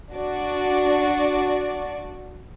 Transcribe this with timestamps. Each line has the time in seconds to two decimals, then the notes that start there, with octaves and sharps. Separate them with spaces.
0.12 D4 F#4 D5